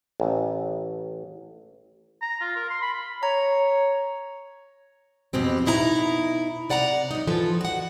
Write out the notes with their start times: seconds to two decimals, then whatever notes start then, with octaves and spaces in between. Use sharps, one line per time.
0.20 A1
2.22 A#5
2.41 F4
2.56 A#4
2.70 C6
2.82 B5
3.23 C#5 A#5
5.33 F2 B2 E3 C4 G4
5.66 B2 D#4 E4 E5 A#5
6.70 C3 D5 F#5 G#5 A#5
7.11 F#2 D#4
7.27 E3 F3 A4
7.61 F#4 F#5